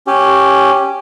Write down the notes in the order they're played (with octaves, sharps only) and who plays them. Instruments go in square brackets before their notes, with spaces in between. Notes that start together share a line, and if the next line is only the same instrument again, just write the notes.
[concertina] C#4 G4